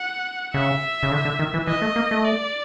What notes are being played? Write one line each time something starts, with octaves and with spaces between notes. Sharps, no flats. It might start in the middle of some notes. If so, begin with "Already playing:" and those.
Already playing: F#5
C#3 E5
C#3
D3
D3
D#3
E3
E3 D#5
A3
A#3
A3
D5